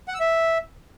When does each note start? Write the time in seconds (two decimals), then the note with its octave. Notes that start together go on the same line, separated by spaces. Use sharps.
0.08 F#5
0.14 E6
0.20 E5